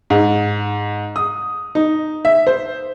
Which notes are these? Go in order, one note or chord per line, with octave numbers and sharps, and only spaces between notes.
G#2
D#6
D#4
E5
C5